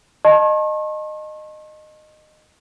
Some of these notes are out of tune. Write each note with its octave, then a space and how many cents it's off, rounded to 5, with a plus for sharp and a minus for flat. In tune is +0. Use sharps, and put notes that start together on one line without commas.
D#5 -20 A5 -5 C#6 -45